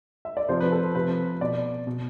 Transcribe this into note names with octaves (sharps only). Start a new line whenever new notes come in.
E5
D5
C3 F3 C5
B4
A4
C3 F3 B4
B2 D5
B2